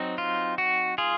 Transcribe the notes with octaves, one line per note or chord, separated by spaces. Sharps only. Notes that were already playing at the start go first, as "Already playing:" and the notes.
Already playing: F#3 C4 D#4
F4
F#4
F4 G#4